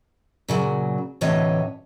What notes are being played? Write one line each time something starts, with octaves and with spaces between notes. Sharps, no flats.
A#2 C#3 F#3
D2 A2 C3 E3 C#5 D#5